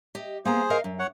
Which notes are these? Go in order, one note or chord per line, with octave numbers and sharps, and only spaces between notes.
G4 D#5
A#3 B3 G#4 C5 A#5
A#4 D#5 F5
F#2
C#5 F#5